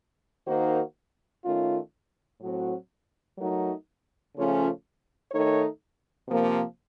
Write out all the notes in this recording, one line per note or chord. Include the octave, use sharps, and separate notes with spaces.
D#3 A#3 D#4 F#4 C5
D#3 A3 C#4 F4
A2 F#3 C4 F#4
F#3 A3 D#4 F#4 A#4
C#3 F3 A3 C#4 F4
D#3 A3 D#4 A4 C#5
C3 F3 A#3